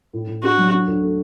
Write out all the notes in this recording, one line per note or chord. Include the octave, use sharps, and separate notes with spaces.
A2
A2
D4 F#4
F#3
D3
D2
A3